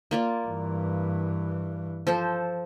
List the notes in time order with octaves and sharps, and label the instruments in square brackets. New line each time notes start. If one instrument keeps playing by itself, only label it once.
[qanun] A#3 F4 D5
[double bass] G2 E3
[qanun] F3 A4 C5